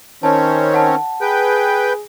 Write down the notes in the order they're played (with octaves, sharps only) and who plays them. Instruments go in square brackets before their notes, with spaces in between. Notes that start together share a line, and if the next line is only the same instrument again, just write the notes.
[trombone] D#3 [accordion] C4 C#4 [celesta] A5
[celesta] F#5 A5
[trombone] G#4 [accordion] B4 G5